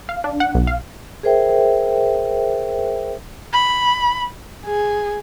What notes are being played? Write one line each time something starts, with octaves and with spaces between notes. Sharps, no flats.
F5
D4
F#5
B1
F5
G#4 A#4 C5 E5 G5
B5
G#4